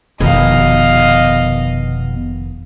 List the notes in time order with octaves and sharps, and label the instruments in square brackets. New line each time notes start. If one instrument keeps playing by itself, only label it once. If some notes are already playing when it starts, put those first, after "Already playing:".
[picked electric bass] F1 D#3 [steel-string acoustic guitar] B2 [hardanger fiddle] D#5 F5